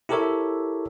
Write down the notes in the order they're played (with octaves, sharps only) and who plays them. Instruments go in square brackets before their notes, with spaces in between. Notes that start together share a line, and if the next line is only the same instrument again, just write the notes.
[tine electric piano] E4 G4 A4 A#4 C#5 E5